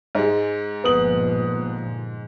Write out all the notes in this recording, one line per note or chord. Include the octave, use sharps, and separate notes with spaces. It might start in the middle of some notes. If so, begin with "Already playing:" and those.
G#2 G#3
G1 A#2 F3 B3 D#6 F#7